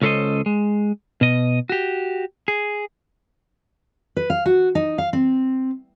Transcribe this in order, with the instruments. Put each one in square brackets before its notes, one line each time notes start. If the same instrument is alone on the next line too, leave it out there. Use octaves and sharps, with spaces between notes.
[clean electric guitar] C#2 C#4 A4 B4 C5 D#5
G#3
B2 D#5
F#4 G4
G#4
[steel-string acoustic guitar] B4
F5
F#4
D#4
F5
C4